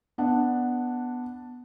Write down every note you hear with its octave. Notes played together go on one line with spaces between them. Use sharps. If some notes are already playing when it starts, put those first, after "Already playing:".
B3 D4 F#5